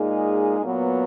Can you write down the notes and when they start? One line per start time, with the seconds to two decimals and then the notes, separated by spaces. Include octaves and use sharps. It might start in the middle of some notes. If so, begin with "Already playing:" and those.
Already playing: A#2 G#3 D#4 G#4
0.59 A#2 F#3 B3